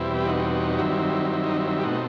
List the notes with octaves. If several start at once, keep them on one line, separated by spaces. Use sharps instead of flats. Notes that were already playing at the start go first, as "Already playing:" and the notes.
Already playing: E2 B2 G3 C4 E4
G4
D#4 F#4
G2 D#3 F#3 C4 E4
E4
D#4
E4
G4
B2 A3 C4 D#4 F#4